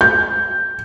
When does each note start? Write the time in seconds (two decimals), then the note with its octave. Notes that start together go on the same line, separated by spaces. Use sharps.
0.01 G6